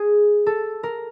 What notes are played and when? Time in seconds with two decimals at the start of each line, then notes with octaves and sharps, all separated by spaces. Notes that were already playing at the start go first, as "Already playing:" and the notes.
Already playing: G#4
0.46 A4
0.83 A#4